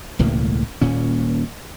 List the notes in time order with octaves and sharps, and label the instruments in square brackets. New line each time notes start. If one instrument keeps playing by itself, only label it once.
[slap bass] E1 C#2 A2 A#3
D#1 A#2 C#4